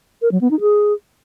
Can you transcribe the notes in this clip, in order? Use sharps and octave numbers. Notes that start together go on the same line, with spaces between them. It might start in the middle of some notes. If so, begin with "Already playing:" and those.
A#4
F#3
B3
D#4
G#4